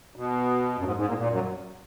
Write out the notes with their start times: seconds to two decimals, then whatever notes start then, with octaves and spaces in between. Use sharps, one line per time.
0.16 B2
0.78 F#2
0.85 G#2
0.96 G#2
1.07 A#2
1.18 A#2
1.29 F#2